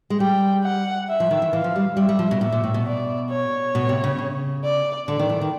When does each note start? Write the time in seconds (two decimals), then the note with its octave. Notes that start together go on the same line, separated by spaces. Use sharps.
0.10 G#3
0.20 G3 G5
0.64 F#5
1.09 E5
1.20 F3
1.31 D#3
1.42 E3
1.52 E3 F5
1.64 F3
1.76 G3
1.97 G3 E5
2.09 G3
2.19 F3
2.31 B2
2.41 A#2 E5
2.52 A#2
2.64 A2
2.74 B2
2.86 D5
3.30 C#5
3.75 B2
3.89 C3
4.04 C#3
4.18 C#3
4.64 D5
5.07 D3 D5
5.19 D#3
5.29 E3
5.41 D#3